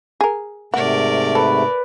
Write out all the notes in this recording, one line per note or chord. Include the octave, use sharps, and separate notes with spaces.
G#4 A#4
G#2 C3 A3 A#4 D5 F#5
A4 B4